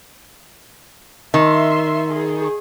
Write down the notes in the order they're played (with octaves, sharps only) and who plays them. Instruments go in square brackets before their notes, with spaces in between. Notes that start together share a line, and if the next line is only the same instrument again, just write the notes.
[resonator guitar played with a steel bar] D#3 [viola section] E5 C6
[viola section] G#4